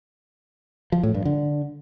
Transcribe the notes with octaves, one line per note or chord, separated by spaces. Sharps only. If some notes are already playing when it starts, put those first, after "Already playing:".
F3
A2
G2
D3